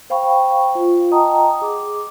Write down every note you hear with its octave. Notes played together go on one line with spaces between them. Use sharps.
C5 F5 G5 B5 C#6
F4
D#5 F#5 G5 A5 A#5 D#6
G#4 D6